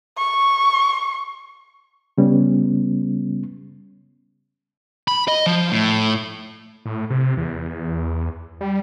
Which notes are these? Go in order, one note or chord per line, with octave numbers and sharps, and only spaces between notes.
C#6
C#3 G3 B3 C#4
B5
D#5
F3
A2
A2
C3
E2
G3